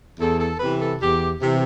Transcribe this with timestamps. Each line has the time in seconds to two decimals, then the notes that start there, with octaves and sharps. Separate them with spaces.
0.19 E2 A4
0.39 A4
0.60 C3 E3 B4
0.80 A4
1.00 E2 G4
1.41 C3 E3